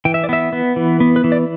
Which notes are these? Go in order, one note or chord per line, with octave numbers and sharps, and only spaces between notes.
E3 G5
E5
D5
B3 E5
B3
E3
B3
B4
E3
D5